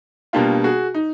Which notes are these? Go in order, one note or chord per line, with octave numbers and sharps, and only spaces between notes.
B2 G3 A#3 D4 F4 G4
F#4 G#4
D#4